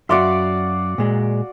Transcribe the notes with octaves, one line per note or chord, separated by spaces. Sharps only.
F#2 F#4 D5 E5 F5 C6
A#2 G#3